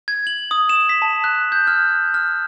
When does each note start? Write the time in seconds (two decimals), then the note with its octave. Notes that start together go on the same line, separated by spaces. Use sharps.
0.08 G#6
0.27 F#7
0.51 D#6
0.69 E7
0.89 B6
1.02 A5
1.24 F#6
1.52 G6
1.67 F6
2.14 F6